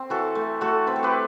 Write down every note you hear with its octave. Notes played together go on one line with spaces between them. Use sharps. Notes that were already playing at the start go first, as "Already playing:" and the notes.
Already playing: C4
E3 F#4 A4
A3
A3 F#4 A4
C4 B4
A4
G4 B4